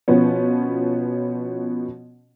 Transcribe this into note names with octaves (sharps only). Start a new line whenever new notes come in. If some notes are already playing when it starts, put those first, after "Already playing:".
B2 F3 B3 C#4